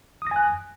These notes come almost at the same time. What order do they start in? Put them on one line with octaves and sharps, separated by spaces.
D#6 A#6 G#5 F#6